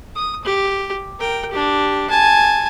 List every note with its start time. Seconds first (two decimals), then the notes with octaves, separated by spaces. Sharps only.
0.15 D#6
0.44 G4
1.19 A#4 G5
1.51 D4 G4
2.09 G#5 A5